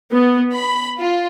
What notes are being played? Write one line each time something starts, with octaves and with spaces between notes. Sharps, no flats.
B3
B5
F4